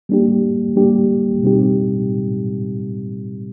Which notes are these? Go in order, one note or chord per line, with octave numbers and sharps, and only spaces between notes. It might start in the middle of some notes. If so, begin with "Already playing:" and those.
G3 A#3 D4 G4
G3 A#3 D4 G4
B2 G3 C4 D#4 G4